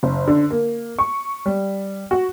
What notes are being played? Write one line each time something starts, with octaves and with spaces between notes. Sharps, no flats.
F#1
D3
A#3
C#6
G3
F#4